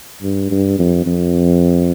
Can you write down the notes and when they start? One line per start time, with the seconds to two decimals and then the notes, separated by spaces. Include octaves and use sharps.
0.22 G2
0.51 G2
0.79 F2
1.06 F2